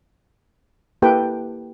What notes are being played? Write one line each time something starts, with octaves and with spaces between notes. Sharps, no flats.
A#3 E4 G4 A4 B4 G5